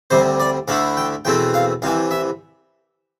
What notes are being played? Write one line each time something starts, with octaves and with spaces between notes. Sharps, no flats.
D2 C3 G3 C5
D5
D2 D3 A3 E4 F5
G5
E2 B2 A3 C4 G5
F5
C2 C3 E3 F5
E5